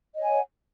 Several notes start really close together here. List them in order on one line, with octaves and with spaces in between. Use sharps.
D#5 C#5 G#5 F#5